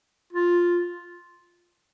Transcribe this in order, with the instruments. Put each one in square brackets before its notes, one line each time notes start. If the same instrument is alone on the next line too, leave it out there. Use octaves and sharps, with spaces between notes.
[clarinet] F4